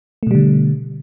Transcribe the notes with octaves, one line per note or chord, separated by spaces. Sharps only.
B2 D3 G3 A3